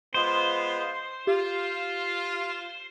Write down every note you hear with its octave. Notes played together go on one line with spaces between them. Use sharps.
G#3 B3 F4 C5
F4 G4